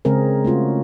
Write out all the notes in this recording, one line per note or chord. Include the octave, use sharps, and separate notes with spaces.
C#3 G#3 C4 G#4 A#4
A3 C#4 F4 F#4